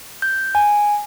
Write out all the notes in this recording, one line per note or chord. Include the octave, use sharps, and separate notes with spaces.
G6
G#5